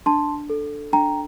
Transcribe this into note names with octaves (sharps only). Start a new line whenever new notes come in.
D4 A5 C6
A4
D4 G5 A#5